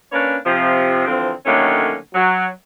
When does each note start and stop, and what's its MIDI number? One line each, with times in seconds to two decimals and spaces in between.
0.12 0.36 58
0.12 0.36 61
0.12 0.36 62
0.12 0.36 71
0.12 0.36 73
0.46 1.05 48
0.46 1.05 53
1.06 1.32 50
1.06 1.32 52
1.06 1.32 53
1.06 1.32 60
1.46 1.96 50
1.46 1.96 51
1.46 1.96 54
1.46 1.96 57
1.46 1.96 58
1.46 1.96 61
2.14 2.47 54